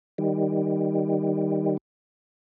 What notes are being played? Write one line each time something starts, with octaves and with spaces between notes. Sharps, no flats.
D#3 G3